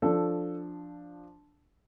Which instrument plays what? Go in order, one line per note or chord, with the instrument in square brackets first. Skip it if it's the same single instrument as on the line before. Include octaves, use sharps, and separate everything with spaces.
[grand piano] F3 D4 A4